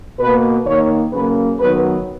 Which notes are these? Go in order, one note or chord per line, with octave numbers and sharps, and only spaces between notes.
B2 A#3 B4
D#3 A#3 C#5
C#3 F#3 A#3 B4
D#3 F#3 B3 B4